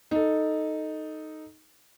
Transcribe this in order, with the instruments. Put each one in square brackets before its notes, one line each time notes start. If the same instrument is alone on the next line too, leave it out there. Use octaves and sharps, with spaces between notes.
[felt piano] D#4 A4